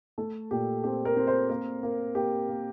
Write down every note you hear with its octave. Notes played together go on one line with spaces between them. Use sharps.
A3 A4
A#2 G4
C4 G4
A#4
C4
C5
A#3 A#4
A#3
A#3 G4
A#3